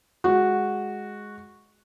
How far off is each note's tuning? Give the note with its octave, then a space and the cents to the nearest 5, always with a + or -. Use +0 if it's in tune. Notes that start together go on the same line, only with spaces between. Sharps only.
G#3 +0 F#4 -5